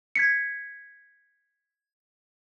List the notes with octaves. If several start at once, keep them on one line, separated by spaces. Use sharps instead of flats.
G#6 B6 C#7